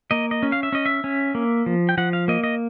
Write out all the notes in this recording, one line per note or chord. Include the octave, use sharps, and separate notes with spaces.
A#3 D#5
D#5
C#4
F5
E5
C#4 D#5
E5
C#4
A#3
F3
G5
F3 F#5
F5
A#3 D#5
D#5